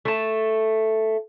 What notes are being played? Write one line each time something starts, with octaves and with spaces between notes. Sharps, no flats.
A3 A5